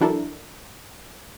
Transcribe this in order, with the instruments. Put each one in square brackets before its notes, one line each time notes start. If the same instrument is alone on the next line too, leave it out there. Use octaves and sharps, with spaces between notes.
[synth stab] E3 F#3 D4 E4 A4 A#4